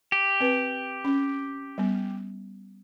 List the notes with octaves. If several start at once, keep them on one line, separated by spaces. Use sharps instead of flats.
G4
C4 B4
C#4
G3 B3